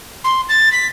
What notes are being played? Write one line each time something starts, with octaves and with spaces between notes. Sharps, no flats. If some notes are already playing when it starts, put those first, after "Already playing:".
C6
A6
B6